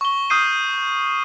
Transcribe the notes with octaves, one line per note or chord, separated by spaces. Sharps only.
C#6 G7
D#6 F6 G6 C7 D#7